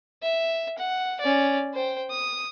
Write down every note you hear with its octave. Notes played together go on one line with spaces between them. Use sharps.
E5
F#5
C#4 D5
C5 G5
D#6